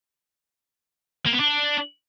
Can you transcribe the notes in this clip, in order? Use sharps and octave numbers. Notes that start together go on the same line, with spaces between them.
A#3
B3
D4